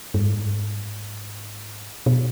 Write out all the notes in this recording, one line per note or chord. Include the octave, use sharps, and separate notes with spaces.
G2
G#2
B2